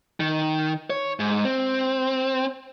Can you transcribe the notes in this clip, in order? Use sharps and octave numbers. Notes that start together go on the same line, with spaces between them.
D#3
C#5
G#2
C4